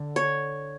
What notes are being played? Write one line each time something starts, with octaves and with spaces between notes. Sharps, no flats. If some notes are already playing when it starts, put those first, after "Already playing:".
Already playing: D3
C#5